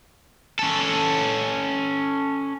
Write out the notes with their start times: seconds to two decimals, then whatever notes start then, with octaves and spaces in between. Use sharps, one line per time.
0.59 C#4 A4